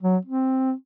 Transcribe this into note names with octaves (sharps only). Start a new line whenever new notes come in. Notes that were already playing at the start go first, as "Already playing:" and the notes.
F#3
C4